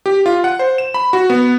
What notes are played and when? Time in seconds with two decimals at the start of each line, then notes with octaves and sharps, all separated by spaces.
0.06 G4
0.26 F4
0.44 F#5
0.59 C5
0.78 E7
0.94 B5
1.13 F#4
1.30 B3